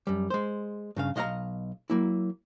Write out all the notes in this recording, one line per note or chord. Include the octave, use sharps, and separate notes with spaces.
F#2 G3
G#3 C5
G2 C#3 F5
B1 D#5 F5 F#5 A#5
F#3 A#3 E4